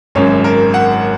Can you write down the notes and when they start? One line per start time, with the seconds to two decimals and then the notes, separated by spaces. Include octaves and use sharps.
0.15 G#1 F#2 C#3 C#5
0.44 A#4
0.74 F#5